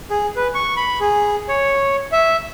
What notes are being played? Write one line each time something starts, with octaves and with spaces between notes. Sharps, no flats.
G#4
B4
C#6
B5
G#4
C#5
E5